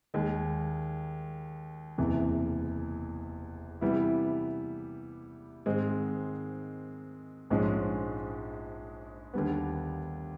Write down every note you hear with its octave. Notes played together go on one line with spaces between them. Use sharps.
D#2 D#3 G#3
F#1 E2 C3 E3
C3 E3 G3 B3 E4
G#2 D#3 G#3 C4
A#1 G#2 F3 G#3 C#4
D#2 D3 G3 B3